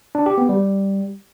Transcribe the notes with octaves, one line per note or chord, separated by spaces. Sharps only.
D4
G4
B3
G3